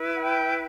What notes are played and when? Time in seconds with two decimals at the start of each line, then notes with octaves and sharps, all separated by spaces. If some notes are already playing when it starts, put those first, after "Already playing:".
Already playing: E4 B4
0.15 F#5
0.21 G5